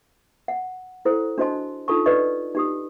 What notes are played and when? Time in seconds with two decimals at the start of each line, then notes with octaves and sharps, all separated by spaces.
0.48 F#5
1.05 E4 A4 C5
1.38 D4 F#4 C5 D#5 A5 C6
1.88 D4 D#4 F4 A4 A5 C#6
2.06 D#4 B4 D5 D#5 C#6
2.55 D#4 G4 D#6